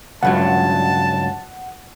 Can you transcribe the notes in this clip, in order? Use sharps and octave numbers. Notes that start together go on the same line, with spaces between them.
C#2 G2 F#3 F#5 A5